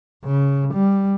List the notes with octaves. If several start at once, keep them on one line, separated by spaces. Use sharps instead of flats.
C#3
G3